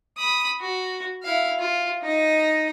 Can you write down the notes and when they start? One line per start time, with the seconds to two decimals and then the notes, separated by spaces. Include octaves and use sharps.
0.17 B5 D#6
0.61 F#4
1.23 E4 F5
1.59 F4
2.02 D#4 D#5